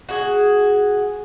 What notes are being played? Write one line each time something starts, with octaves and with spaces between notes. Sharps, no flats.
F#4 G#4